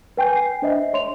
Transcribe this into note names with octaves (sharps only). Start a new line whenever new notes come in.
B4 G5 G#5 G6
C7
D4 C5 D#5 E5
C#5 C6 F7